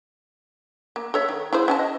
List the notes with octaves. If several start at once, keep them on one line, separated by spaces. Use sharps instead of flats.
A#3
A4 C#5 E5
D#3
E4 G#4 C5
C#4 G#5 A5
D#5